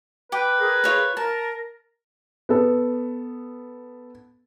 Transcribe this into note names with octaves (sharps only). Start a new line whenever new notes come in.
B4 G5 D6
G#4 A#4
F4 C#5 B5
A#4 A5
B3 A4